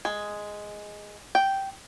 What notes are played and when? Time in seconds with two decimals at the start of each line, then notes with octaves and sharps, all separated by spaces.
0.05 G#3
1.35 G5